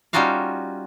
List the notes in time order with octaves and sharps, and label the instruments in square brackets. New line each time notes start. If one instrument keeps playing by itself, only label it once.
[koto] G3 C#4 D#4 F4 F#4 F5